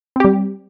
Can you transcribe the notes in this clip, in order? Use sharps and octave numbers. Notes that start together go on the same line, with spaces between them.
G3 C4 G4